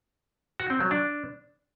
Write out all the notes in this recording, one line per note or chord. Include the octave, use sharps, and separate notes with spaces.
F#4
C4
F#3
D4